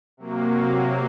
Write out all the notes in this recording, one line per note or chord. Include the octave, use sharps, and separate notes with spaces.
C3 F#3 A#3